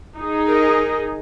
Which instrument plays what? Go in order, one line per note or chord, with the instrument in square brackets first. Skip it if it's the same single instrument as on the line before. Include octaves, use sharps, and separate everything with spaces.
[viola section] D#4 G#4
[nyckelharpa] A#4 D#5